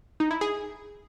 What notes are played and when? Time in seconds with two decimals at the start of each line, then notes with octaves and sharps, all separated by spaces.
0.20 D#4
0.31 E4
0.41 G#4